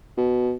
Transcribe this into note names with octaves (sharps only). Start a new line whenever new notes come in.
B2